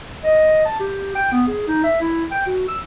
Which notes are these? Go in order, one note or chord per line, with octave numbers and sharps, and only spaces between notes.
D#5
A5
G4
G5
B3
G#4
D#4
E5
E4
G5
F#4
E6